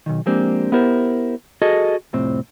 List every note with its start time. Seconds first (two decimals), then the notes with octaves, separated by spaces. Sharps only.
0.06 B1 E2 D#3
0.26 F3 G#3 A#3 C4 D4 G4
0.72 B3 E4 G4 A#4 C5
1.62 F#4 G#4 A4 D#5
2.13 C2 F2 A2 C4